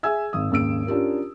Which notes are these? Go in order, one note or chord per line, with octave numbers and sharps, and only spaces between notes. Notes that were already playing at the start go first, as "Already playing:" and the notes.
G#4 E5 G#5 E6 G#6
G#1 D#6
G#1 D#2 C#3 E6 D7
C#4 D4 F4 G4 A#4